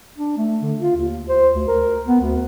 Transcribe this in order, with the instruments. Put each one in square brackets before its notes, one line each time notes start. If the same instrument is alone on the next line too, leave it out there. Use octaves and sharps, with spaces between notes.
[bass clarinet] D4
A3
D3
F4
D#2
C5
D2
A#4
B3
D2